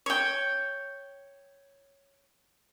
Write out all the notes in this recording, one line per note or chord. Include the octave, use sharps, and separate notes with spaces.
C#5 G5